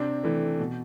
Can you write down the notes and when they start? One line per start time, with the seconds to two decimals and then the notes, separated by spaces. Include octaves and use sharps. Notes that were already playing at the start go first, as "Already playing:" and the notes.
Already playing: C3 C4 D4
0.24 E3 A3
0.59 B2